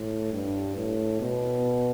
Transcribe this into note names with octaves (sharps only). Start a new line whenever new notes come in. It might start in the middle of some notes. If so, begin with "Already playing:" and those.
Already playing: A2
G2
A2
B2